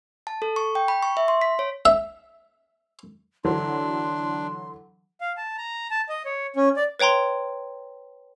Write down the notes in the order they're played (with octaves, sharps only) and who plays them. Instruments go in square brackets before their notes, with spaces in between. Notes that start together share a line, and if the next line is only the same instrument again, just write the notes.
[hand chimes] A5
A4
C#6
G5
B5
C#6
E5
C6
B6
C#5
[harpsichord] E5
[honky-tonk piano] D3 E3 F#3 [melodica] D4 [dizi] C6
[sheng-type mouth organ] F5
A5
A#5
A5
D#5
C#5
C#4
D5
[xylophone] B4 C#5 G5 A#5 C6